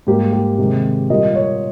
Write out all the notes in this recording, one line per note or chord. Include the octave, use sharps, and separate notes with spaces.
G#2 G3 A#3 G4
G4
C3 D#3 G#3
A#2 G3 A#3 D#5
C#5